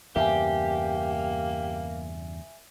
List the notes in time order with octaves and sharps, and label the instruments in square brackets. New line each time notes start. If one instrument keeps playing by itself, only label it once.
[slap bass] E2 G2 C#3 [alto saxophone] A#3 [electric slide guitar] G4 [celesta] E5 G#5